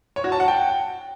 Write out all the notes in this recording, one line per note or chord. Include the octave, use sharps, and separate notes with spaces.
C#5
F#4
A5
F#5
G5